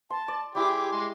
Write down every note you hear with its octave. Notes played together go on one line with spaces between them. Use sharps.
A5 C6
D5
G3 E4 G4 G#4 D6 D#6
D6
G#3 C6